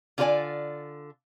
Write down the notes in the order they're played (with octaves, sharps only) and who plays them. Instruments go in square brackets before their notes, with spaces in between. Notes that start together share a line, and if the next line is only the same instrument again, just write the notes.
[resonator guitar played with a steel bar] D3 F4 A4 C5 D5 G#5